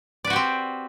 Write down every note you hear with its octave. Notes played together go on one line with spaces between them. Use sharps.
C4 F#4 G4 B4 D5